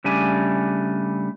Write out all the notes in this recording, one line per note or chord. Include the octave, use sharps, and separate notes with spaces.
C#3 G3 A3 D4 G#5